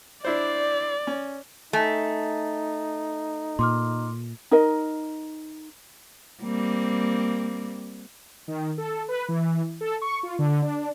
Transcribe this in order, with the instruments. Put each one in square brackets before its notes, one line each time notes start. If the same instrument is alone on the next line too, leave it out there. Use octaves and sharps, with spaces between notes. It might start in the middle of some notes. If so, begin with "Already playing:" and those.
[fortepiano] D4 E4 C5 [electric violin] D5
[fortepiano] C#4
[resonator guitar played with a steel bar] A3 [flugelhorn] D#4 [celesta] G#5
[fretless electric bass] A#2 [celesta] C6 D6 F6
[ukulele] D#4 A#4 D#5
[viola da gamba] G3 A#3 C4
[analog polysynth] D#3
A4
B4
E3
A4
C#6
F4
D3
D4